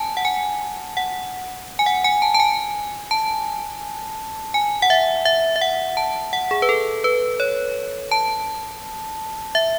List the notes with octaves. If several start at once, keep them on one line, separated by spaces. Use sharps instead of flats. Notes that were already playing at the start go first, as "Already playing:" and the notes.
Already playing: G#5 A5
F#5
G#5
F#5
G#5
F#5
G#5
A5
A5
G#5
A5
G#5
F#5
E5
E5
E5
F#5
A5
F#5
G#4
B4
A4
B4
C#5
A5
E5